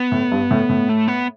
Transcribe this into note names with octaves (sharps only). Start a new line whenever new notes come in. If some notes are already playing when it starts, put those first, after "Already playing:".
Already playing: B3
A2
G2
A2
A2
A3
B3